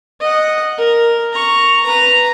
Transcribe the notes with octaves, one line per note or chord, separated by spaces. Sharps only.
D#5 F#5
A#4
A#5 C#6
B4 A#5